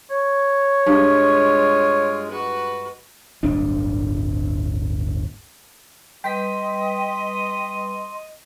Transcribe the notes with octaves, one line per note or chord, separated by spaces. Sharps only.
C#5
G2 G#3 F4
F#4 B4
D1 G1 D4
G3 B4 D#5 G5 C6 B6